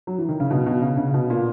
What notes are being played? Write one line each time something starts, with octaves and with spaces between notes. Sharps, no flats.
F#3
E3
D#3
C#3
B2
B2
C#3
C#3
B2
A#2